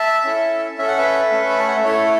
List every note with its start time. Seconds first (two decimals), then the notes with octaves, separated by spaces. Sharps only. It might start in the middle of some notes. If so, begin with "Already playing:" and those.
Already playing: E5 A5
0.24 C#4 E4 A4
0.78 C#4 A4 E5
0.88 F#5
0.97 B4 E5
1.32 A3 C#4 A4
1.50 B5
1.59 A5
1.68 F#5
1.76 E5
1.84 A3 E4 A4 C#5